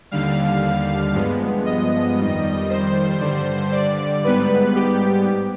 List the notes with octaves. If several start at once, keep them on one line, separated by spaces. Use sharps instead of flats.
D#2 D3 G3 F5
F5
G2 F3 G#3 B3
D#5
F2 D#3 G3
C5
G2 D3 G3
D5
G#2 G3 B3 B4
G4